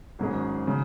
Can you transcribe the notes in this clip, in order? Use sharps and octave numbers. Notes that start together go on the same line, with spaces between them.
G#1 G#2 F#3 C#4 G#4
C#3 F#3